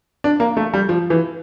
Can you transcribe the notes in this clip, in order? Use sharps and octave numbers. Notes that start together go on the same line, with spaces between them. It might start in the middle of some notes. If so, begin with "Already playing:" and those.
D4
A#3
A3
G3
F3
E3